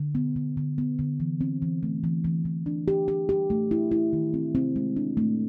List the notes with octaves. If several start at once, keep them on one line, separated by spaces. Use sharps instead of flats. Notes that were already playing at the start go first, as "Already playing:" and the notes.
Already playing: D3
B3
D3
D3
B3
D3
E3
C4
E3
A3
E3
E3
E3
D4
G4
G4
G4
A3
E4
E4
D#3
C4
C4
G#3
D4
A3